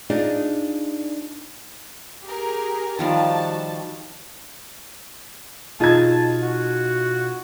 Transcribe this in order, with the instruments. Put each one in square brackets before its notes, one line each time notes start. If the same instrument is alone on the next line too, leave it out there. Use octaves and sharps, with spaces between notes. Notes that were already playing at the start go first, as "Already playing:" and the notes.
[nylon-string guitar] D4 D#4 F4 G#4 D5 D#5
[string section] G4 G#4 A#4
[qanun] D#3 F3 G3 [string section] F#4 A5
[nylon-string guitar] B2 D#4 G#4 [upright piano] F4 G#6 [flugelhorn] A5
[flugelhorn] F#4